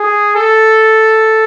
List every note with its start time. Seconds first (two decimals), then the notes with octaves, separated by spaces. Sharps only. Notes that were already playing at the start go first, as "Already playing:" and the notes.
Already playing: G#4
0.36 A4